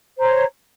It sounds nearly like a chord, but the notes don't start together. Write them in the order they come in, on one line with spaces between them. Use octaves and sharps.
C5 A#5 C#5